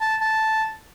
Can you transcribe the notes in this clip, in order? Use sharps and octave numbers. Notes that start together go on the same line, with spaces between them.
A5
A5